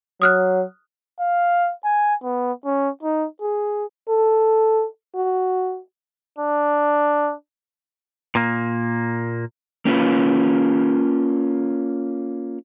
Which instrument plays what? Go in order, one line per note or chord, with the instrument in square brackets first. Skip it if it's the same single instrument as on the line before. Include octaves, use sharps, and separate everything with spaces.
[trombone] F#3 [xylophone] D#6 F6 F#6
[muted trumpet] F5
G#5
B3
C#4
D#4
G#4
[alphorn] A4
F#4
[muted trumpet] D4
[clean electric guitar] A#2 A#3
[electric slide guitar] A#3 C#4 F4 B4